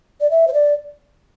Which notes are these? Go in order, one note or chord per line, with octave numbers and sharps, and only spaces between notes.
D5
E5
C5
D5